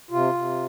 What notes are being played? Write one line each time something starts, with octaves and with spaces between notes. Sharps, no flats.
C3 F4
C3